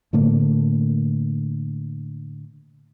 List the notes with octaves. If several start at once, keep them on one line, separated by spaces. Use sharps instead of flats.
A2 D3 A3 A#3